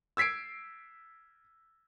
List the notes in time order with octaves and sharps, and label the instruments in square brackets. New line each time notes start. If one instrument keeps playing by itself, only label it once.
[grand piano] E6 G#6 B6 C7 D7